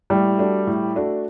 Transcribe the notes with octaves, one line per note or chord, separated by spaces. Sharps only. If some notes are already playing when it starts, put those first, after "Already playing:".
A2 G3
A3 D4 F#4
A2
A3 D4 F#4